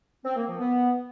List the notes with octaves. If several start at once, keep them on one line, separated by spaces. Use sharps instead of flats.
C4
A#3
F3
B3